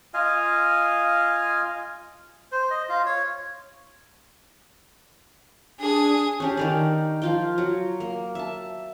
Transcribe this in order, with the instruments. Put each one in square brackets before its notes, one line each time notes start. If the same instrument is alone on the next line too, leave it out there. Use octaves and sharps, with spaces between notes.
[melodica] F4 D#5 F5 G#5
C5
D#5
F4
C#5
[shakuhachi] D4 [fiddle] G#4 D#6
[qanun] C#4 D4 G4
D#3 A#4 D5
F3 F4 G5
F#3
A#3
E5 A5